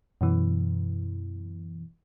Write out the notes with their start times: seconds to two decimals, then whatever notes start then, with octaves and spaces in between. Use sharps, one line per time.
0.21 F#2 B2 E3